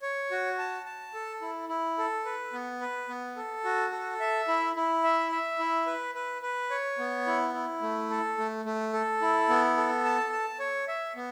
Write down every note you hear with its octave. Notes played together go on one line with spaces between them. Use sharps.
C#5
F#4
A5
A5
A4
E4
E4
A4
B4
B3
B4
B3
A4
F#4
A4
E5
E4
E4
E5
E5
E4
B4
B4
B4
C#5
B3
E4
E4
A3
A4
A3
A3
A4
E4
B3
A4
A5
A5
C#5
E5
B3